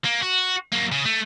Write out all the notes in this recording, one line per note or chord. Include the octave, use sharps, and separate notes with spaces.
A#3
F#4
F#3 A#3
C#3
A3